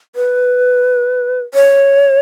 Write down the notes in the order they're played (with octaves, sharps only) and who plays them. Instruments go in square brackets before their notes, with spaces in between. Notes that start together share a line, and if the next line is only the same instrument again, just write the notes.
[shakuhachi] B4
C#5